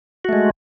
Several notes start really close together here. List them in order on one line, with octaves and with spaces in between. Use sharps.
F#4 A3 G#3